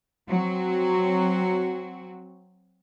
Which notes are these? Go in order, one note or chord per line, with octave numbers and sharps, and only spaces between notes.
F#3 C4 F#4